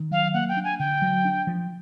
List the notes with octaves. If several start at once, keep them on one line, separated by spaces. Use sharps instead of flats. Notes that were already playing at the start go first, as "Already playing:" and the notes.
Already playing: D#3
F#3 F5
A#3 F#5
G5
D4
G#5
D3 G5
F#3
D4
F3